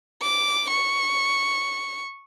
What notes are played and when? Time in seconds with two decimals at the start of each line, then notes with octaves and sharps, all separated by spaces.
0.22 D6
0.70 C#6